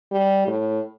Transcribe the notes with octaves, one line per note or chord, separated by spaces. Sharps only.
G3
A2